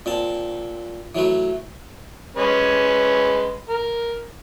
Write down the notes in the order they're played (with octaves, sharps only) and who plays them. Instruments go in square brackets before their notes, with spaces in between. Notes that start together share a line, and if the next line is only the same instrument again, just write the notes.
[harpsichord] A#2 C4 A5
E3 F#3 A3 B4
[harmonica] G#3 C#4 B4
A#4